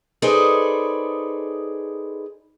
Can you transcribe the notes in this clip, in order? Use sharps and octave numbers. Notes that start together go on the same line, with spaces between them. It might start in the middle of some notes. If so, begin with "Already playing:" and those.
D#4 G#4 A4 B4 C5 D5